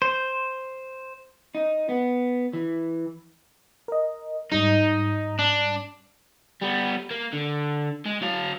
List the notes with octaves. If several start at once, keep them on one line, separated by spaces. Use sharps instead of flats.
C5
D#4
B3
E3
A#4 D#5
G#2 G3 D#4
D4
G3 B3
A#3
D3
G#3
F#3 F5